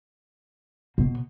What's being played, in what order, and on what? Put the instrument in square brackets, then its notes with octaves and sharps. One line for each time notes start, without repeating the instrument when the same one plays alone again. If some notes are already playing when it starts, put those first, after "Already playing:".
[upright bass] B2